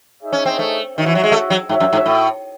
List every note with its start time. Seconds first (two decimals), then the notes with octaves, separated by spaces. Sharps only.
0.22 D#4 G#4 C#5 E5
0.33 C#4
0.45 C4
0.59 A3
0.96 D#3 F#4 C#5 E5
1.06 E3
1.15 F#3
1.23 G#3
1.32 A3
1.50 F#3
1.69 G#2 F#4 C#5 E5
1.80 F#2
1.93 G#2
2.06 A2